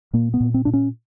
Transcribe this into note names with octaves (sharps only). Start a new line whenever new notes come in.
A#2 A#3
B3
A#2
C4
A#2 D4
C#4